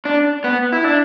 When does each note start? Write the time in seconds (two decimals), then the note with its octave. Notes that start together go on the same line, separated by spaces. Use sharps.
0.05 D4
0.44 B3
0.72 E4
0.84 D4